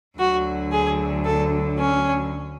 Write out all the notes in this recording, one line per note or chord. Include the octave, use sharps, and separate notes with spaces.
D2 D3 F#3 F#4
G#4
A4
C#4